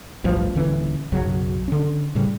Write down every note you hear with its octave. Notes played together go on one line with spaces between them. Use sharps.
A1 D2 G2 F3
D#1 D3 E3 C#4
B1 F#2 C#3 F#3
D3 C#4
A2 C#3 G3